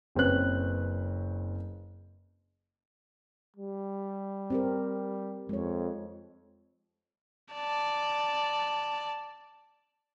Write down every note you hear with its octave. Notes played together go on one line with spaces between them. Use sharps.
F#1 C4 C#4 B4 F#6
G3
C4 G4 A#4
F2 G#3 C#5
D5 A5